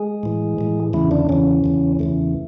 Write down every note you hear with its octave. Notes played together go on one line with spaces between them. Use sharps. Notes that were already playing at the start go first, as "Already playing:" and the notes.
Already playing: G#3 G#4
A2 E3
A2 E3
E2 C#3 E3 E4
D3 D4
E2 C#3 E3 C#4
E2 C#3 E3
E2 C#3 E3 A3